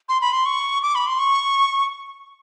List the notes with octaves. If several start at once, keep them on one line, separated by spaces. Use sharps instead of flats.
C6
B5
C6
C#6
D6
B5
C6
C#6